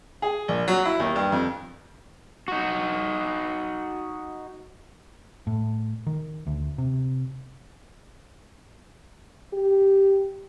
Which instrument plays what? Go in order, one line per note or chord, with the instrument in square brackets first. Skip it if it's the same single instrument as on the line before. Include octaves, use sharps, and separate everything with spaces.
[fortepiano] G#4
A#1
F#3
E4
D#2
G2
F2
[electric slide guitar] D#4 F#4
[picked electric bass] A2
D#3
D2
C3
[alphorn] G4